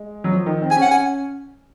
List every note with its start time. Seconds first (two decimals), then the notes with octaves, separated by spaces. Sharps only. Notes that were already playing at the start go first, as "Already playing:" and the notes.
Already playing: G#3
0.24 F#3
0.31 F3
0.46 D#3
0.62 C4
0.71 G#5
0.76 C#4
0.82 F#5
0.91 G#5